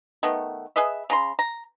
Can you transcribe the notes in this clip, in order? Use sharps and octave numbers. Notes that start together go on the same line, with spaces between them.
D#3 A3 B3
G#4 B4 D#5 E5
C#3 A#5 C6
A#5